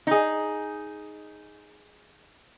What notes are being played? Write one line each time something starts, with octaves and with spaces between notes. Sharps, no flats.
D#4 G#4